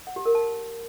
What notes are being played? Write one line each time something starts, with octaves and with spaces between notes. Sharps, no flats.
F#5
G4
A#4
A5